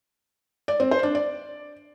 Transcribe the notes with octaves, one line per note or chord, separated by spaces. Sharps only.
D5
C4
C5
D4
D5